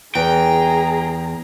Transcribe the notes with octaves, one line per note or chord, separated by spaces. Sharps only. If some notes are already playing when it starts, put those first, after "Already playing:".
E2 G#4 G5 A#5